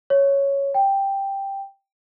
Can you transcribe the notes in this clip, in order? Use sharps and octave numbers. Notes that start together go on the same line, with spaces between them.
C#5
G5